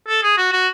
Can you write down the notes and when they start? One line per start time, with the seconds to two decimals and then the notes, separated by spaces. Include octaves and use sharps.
0.08 A4
0.23 G#4
0.37 F#4
0.52 F#4